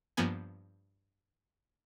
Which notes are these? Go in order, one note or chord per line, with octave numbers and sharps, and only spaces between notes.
G2 F3 A#3 B3 G#5